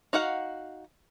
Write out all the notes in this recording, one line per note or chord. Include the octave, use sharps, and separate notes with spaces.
D#4 F#4 F5 F#5